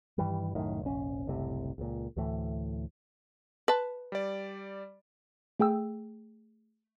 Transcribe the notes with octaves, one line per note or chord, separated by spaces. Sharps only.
G2 D#3 E3 G3
C2 F#2 A2 D#3
F1 A#1 C#4
F#1 C2 A2 C3
C#2 A#2
D2 A2 E3 A3
B4 A5
G3 D5
A3 G#4 G5 E6